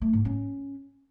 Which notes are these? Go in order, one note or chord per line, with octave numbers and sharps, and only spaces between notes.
A3
G#2
C#4